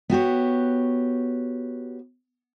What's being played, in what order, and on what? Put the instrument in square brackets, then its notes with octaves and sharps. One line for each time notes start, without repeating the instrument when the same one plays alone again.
[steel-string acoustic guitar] B3 F#4 G4 C#5